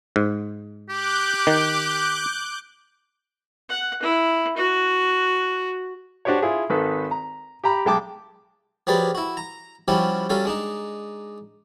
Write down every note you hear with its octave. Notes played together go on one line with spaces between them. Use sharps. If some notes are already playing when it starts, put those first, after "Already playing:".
G#2
G4 D6 F#6 G6
D#3
F#5
E4
F#4
D4 F#4 G4 C5 C#5
E4 F4 G#4
G#1 D#3 A4 B4
A#5
G4 G5 A#5 B5
B1 G#3 G5 A5 D6
F3 F#3 G4 G#4 B4 D5
E4 F#4
A#5
F3 G3 C#4 E4 F#4 G4
F#3 G3 C#4 A4 F5
G#3 D4 D#4